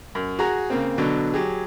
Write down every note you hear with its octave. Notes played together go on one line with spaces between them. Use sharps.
F#2
F#4 G#4 A#5
C#3 A#3 C4
B2 D3 F#3
F#3 G4 G#4